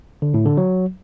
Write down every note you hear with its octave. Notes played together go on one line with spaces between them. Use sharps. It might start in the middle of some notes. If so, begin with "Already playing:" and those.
D3
A2
D3
F#3